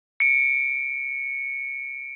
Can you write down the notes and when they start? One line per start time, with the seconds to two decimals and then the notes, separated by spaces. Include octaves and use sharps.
0.20 C#7 D7